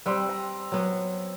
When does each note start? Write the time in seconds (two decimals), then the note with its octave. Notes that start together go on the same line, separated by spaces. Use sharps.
0.06 G3 C4 B4 C6 E6
0.29 A#5
0.72 F#3 B3